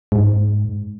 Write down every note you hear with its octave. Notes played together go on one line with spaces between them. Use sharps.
G#2